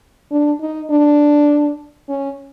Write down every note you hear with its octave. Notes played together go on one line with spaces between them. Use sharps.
D4
D#4
D4
C#4